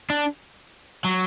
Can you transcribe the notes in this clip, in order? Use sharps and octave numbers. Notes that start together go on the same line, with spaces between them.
D4
F#3